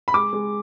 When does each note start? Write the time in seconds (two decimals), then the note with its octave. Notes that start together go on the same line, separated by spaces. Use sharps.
0.08 B5
0.14 G#3 D6
0.33 G#3